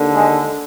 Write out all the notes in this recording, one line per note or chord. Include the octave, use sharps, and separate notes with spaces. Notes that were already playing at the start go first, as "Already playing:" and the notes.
Already playing: D#2 D3
G#3